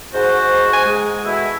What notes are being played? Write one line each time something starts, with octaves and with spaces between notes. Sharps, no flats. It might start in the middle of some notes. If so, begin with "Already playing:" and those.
G#2 F#4 C5
G#5
G#3
B2 A3 E4